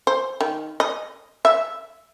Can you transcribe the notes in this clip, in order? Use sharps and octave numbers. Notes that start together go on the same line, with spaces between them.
C5
D#3
D#5
E5